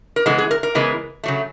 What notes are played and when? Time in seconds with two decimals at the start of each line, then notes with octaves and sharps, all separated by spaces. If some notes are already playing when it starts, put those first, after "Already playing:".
0.16 A#4
0.26 C#3 E3 G#3 B3 A4
0.38 G#4
0.51 A#4
0.63 A#4
0.75 C#3 E3 G#3 B3
1.23 C#3 F#3 A3